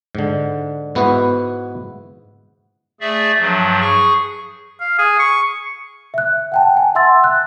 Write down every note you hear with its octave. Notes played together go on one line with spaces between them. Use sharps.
G#2 D3
G#2 B3 E4 F#4 B4
A3 G#4 D5 E5
G2 F3 F#3
G#4 C#6
F5
G#4
C#6
E5 F#6
F#5 G5 A5
G#5 A5
E5 F#5 C6 E6 A6
F#6